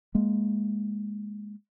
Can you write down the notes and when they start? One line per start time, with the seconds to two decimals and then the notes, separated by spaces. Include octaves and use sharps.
0.15 G#3 A#3